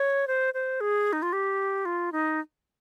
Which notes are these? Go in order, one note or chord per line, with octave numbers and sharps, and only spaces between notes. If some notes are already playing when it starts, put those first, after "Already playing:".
Already playing: C#5
C5
C5
G#4
D#4
F4
G4
F4
D#4